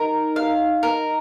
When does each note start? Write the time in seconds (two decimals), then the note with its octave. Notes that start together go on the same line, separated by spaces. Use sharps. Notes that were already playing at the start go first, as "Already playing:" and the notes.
Already playing: D#4 A#4
0.36 F5
0.83 A#4